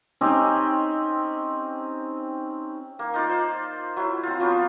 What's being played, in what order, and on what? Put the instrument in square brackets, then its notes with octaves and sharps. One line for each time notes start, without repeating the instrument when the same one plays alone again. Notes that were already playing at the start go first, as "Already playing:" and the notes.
[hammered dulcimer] C4 C#4 D#4 G4
[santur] A#3
D#4 F4 D5
C5
F#3 E4
C4 F4
F3 F#3 B3 F4